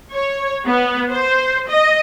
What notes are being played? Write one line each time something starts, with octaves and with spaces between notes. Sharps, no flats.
C#5
B3
C5
D#5